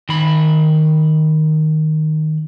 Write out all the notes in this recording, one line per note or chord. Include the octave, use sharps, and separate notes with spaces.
D#3 B5